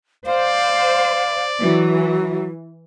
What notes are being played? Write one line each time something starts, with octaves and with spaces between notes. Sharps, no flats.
C5 D5 F5
E3 F#3